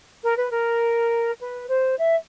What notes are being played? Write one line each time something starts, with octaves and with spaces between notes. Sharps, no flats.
A#4
B4
A#4
B4
C5
E5